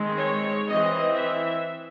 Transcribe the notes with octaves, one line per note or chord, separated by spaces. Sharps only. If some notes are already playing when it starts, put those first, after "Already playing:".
Already playing: D#3 G#3 C4
C#5
E3 C4 D#5
E5